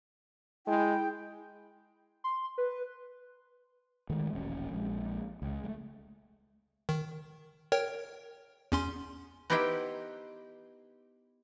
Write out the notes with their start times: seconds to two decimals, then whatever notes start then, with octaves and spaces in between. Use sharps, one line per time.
0.67 G#3 E4 G5
2.24 C6
2.58 B4
4.10 D#3 G#3 A3
4.33 E1 A#1 C#4
4.71 A#1 G#3
5.42 C#2
5.64 G#3 A3
6.89 D#3
7.72 A#4 C#5 G5
8.72 E2 C#4 C6
9.50 B3 D#4 E4 G4 C5 G5